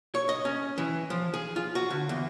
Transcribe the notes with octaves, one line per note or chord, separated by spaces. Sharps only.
C#5
D#5
C#4
E3
F3
G#4
F4
F#4
D3
E2